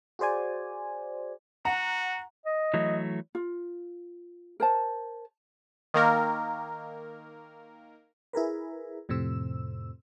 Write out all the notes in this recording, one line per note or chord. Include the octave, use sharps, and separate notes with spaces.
F#4 G#4 C5 D5 G#5
F#4 F#5 A#5
D#5
E3 F#3 A3
F4
A#4 C5 A5
D#3 A#3 A#4
E4 G#4 A#4 B4
F2 A2 C3 C4 E6